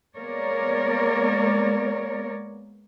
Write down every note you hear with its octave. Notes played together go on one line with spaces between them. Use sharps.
G#3 A#3 B3 A#4 C#5 D5